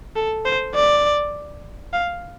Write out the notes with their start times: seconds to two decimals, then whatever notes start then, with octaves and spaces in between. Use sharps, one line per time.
0.16 A4
0.45 C5
0.75 D5
1.94 F5